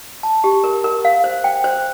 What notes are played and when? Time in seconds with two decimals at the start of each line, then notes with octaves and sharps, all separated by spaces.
0.23 A5
0.44 G4
0.64 A#4
0.84 A#4
1.05 F5
1.24 C5
1.44 G5
1.64 C5